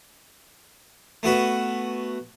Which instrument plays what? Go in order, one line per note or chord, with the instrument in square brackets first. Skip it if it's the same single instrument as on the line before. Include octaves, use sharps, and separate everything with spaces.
[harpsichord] A3 B3 F#4 B4